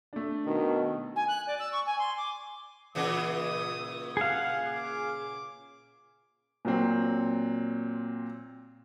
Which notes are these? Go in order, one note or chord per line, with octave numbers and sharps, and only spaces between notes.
A3 D4
B2 D#3
G#5
F#6
D5
E6
C#6
G#5
C6
D6
A#2 C#3 E3 D#6
G#4 F5 F#5
D6
A#2 F#3 C4